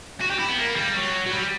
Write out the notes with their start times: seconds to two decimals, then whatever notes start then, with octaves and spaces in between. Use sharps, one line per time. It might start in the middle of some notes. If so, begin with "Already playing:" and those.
0.21 F#4
0.30 G4
0.39 E4
0.49 B3
0.58 A#3
0.76 G3
0.95 F#3
1.26 F#3
1.31 G3